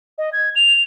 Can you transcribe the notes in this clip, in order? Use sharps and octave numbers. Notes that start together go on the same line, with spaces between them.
D#5
G#6
F7